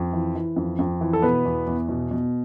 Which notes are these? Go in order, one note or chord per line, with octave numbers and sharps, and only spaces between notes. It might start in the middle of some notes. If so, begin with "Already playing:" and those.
Already playing: F2
E3
E3
F2
F2
E3
A4
B2 B3 B4
E2
E2
B2
B2